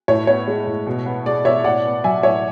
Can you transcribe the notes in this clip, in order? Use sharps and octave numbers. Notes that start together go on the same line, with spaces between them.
A2 C#5
B3 C#5
G#3
A2
B2
B3
G#3 D5
B2 C#5 E5
A2 D5 F#5
B3
F#3 E5 G#5
A2 C#5 E5